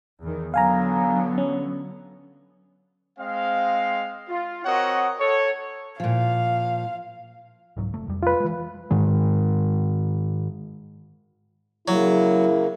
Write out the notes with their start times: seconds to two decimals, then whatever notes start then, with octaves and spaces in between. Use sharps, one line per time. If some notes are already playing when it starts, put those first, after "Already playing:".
0.21 E2 D#3
0.54 D3 F#3 B3 F5 G#5 A#5
1.38 C#4
3.19 G#3 C4 D#5 F5
4.29 F4
4.65 C4 F#4 A#4 C#5 D#5 F#5
5.20 A4 C#5
6.00 A#2 F3 F5
7.77 C2 G#2 F#3
7.93 F#1 A3
8.07 F1 F2 G3
8.23 F4 B4
8.40 E3 G#3
8.91 G#2 D#3 G#3
11.88 C#3 F#3 A#3 E4